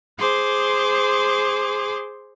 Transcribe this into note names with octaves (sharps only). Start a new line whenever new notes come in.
G#4 C5 C6 D6